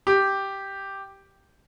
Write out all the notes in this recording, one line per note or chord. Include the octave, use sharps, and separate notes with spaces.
G4